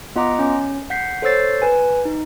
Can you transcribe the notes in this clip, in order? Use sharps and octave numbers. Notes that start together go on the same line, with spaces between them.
B3 F4 D#5 F#5 A#5 D6
C#4
F#5 G6 B6 C7
A4 C5 C#5 E6 A6 C7
B4 G#5
D#4